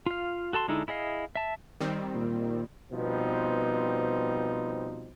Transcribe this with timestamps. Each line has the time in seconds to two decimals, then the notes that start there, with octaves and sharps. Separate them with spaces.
0.06 F4 F5
0.53 F#4 A4 A5 C6
0.68 D3 G#3 D#4 E4 A4
0.88 E4 G#4 D#5 F5
1.36 E5 A5
1.81 D#3 G3 C4
2.15 A#2
2.92 B2 F3 G3 B3 C4 D#4